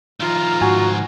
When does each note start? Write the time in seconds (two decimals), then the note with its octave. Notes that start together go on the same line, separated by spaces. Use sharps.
0.20 D#3 F3 F4 A#5
0.61 G#2 F#4 G#5